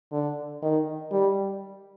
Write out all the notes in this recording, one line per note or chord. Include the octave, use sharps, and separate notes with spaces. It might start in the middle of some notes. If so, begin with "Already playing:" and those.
D3
D#3
G3